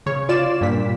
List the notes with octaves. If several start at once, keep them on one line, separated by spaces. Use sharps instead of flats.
C#3 C#5
F4 D5 E7
G2 A#2 B6